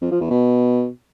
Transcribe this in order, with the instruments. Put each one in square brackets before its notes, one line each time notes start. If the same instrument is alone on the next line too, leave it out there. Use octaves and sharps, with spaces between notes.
[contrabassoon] F2
F3
E2
B2